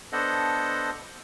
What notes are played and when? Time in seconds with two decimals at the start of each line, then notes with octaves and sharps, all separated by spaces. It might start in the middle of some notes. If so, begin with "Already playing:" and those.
0.12 B3 D4 A4 C5 D#5 F#5